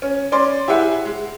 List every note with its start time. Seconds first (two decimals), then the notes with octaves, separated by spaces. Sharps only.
0.02 C#4
0.32 C#4 D5 C6
0.68 E4 G4 G#4 E5 F#5
1.05 G#3